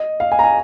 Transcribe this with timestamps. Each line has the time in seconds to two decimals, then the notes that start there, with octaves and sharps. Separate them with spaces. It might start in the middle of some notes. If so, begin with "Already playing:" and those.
Already playing: D#5
0.20 F5
0.32 G#5
0.39 A#5
0.44 G#5